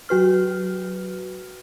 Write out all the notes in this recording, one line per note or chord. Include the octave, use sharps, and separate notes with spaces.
F#3 F#4 B4 F6